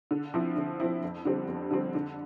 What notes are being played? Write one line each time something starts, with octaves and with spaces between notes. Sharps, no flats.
D3
F3 C4 E4
D3
F3 C4 E4
F2
D3 G3 C4
F2
D3 G3 C4
D3